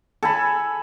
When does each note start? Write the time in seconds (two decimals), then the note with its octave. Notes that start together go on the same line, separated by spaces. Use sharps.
0.23 A4 G#5 B5